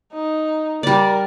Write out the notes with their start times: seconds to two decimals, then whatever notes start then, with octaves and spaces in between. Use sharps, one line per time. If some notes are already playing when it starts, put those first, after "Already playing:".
0.13 D#4
0.83 G3 A#4 D5